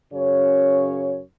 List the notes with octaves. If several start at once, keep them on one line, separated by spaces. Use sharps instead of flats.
F#2 C#3 C#5